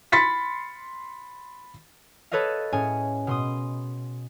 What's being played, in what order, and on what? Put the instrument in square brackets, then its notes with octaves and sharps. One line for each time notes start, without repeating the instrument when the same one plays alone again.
[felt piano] B5 C6 A6 B6 C#7
[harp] A4 B4 C#5 D#5 F5
A2 C#4 G#4 G#5
B2 C6 D#6